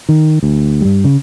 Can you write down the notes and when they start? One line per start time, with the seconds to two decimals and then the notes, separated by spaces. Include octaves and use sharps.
0.09 D#3
0.43 D2
0.81 G2 G3
1.04 C#3